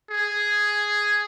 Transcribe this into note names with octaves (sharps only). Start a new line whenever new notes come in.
G#4